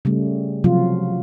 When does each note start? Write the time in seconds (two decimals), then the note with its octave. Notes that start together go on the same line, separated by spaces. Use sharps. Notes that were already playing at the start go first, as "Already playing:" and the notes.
0.05 C#3 G3 A3
0.64 C3 F3 F#3 F4